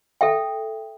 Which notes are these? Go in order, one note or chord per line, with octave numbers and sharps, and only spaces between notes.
A4 E5 G5